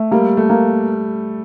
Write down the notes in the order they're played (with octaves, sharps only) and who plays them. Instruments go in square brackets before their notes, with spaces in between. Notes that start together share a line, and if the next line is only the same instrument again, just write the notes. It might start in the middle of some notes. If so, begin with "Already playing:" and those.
Already playing: [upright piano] A3
[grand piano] G3 [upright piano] A#3
[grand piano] A3
[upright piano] A#3